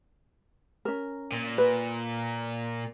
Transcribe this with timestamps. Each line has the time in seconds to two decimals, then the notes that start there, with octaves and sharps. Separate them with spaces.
0.85 C#4 A#4
1.32 A#2
1.58 B4